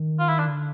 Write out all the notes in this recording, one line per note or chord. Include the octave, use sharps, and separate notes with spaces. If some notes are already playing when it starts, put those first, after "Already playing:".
Already playing: D#3
F4
E4
D4
D3